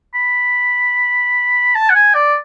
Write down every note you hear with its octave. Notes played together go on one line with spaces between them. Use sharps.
B5
A5
F#5
G#5
D5